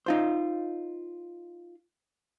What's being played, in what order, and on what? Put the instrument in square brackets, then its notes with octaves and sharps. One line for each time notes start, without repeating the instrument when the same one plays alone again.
[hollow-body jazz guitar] D#4 F4 C5